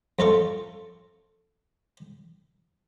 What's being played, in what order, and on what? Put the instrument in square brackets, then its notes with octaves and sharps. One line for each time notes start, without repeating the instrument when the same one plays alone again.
[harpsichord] F2 F4 A4 C#6